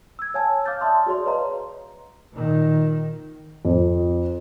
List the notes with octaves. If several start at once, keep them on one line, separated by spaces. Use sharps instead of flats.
E6 G#6
C#5 F5 G#5 A5 E6
F5 D6 F6 G6 A6
D5 E5 A5 C6 D#6
F#4 G#4 C#5 D5 C6
B4 C#5 D#5 F5 A#5 C6
A#2 D#3
F2